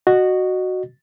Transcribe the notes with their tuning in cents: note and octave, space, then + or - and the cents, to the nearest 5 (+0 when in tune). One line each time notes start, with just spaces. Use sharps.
F#4 +0 D#5 -25